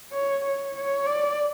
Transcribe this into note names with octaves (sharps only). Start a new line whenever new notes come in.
C#5
C#5
C#5
D5